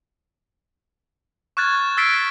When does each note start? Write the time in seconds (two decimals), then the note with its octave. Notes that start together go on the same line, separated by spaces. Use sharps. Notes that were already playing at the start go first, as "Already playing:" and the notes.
1.57 C#6 F6 F#6 G#6 A6
1.97 E6 F6 A6 B6 C7 D7